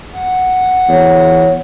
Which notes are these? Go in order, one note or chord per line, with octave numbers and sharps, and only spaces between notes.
F#5
E2 C#5